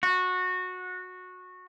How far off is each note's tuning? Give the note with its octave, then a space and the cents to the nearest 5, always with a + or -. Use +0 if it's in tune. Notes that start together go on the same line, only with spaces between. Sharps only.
F#4 -15